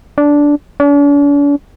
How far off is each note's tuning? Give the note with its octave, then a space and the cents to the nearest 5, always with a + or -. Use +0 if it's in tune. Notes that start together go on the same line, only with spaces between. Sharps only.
D4 -10
D4 -45